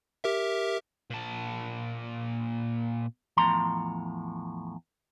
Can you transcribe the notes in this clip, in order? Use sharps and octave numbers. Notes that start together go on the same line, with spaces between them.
G4 A#4 E5
A#2 A5
E2 A2 F3 A#5 C6